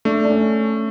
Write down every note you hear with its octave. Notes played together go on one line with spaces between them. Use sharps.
A3 D4
D4
C#4